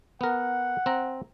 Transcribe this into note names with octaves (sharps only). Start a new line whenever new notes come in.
B3 A#4 F#5
C4 A#5